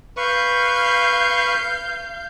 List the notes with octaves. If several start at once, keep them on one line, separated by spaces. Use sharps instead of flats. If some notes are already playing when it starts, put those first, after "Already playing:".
B4 F5 C#6 G6